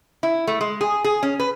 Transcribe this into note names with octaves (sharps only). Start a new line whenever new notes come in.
E4
A3
G#3
G#4
G#4
C#4
B4